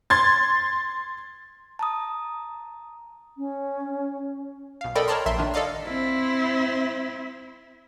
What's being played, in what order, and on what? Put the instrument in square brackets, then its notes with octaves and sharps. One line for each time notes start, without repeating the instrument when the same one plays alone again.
[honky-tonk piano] C6 G#6 A6
[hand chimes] A5 A#5 D#6
[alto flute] C#4
[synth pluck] B1 F5
A4 A#4 D5 D#5 G5 B5
A#4 C#5 D5 A5 A#5 C6
A#1 E5 C6
D#3 D4
A4 D5 D#5 F5
[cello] C4 E4